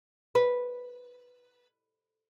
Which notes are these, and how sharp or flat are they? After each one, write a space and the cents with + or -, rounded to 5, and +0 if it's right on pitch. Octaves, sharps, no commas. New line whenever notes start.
B4 -5